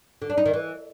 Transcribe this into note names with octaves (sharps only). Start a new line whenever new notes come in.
D3
D4
D#4
D#3
E3